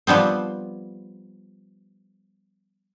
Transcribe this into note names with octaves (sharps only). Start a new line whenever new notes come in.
F3 G3 B3 C4